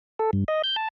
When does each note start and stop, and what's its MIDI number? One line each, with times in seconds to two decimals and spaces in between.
0.19 0.31 69
0.33 0.44 43
0.48 0.62 75
0.64 0.76 91
0.76 0.88 81